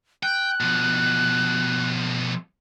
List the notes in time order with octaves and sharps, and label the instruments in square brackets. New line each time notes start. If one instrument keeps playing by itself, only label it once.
[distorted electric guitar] G5 [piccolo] F#6
[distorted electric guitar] B2 F3